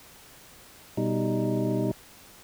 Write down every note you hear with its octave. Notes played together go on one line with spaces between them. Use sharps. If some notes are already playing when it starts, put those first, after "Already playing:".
B2 G3 D#4